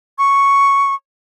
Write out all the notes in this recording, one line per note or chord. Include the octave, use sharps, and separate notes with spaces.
C#6